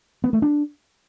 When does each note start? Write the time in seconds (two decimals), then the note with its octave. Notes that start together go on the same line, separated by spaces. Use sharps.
0.24 B3
0.33 A3
0.42 D4